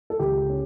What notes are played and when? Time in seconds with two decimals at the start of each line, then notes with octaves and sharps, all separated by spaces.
0.10 A4
0.19 C#2 G4
0.49 C#4